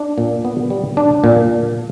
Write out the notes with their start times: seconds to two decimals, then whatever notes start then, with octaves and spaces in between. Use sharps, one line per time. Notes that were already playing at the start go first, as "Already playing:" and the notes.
Already playing: D4
0.18 A#2
0.45 B3
0.70 G3
0.97 D4
1.24 A#2